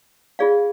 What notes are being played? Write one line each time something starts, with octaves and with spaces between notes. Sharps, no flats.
F4 G#4 D5 F5